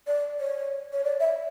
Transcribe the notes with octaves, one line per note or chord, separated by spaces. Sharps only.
D5
C#5
C#5
D5
E5